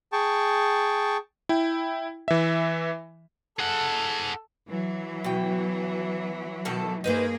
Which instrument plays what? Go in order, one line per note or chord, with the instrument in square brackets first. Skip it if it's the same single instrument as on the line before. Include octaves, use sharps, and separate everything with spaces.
[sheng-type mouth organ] G#4 G5 A5 C#6
[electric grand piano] E4 G5
E3 E5
[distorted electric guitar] G#4 F#5 [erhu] A4
[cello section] E3 F#3
[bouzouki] B2 G5
B2 D#3 A4
[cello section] G2 A#3 G#4 [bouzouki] D#4 B4 C5